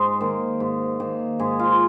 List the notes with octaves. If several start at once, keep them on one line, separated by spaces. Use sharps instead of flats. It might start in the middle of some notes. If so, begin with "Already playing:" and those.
Already playing: G#2 C5
D#3 A#3
G#2
D#3 A#3
G#2 G#4
F4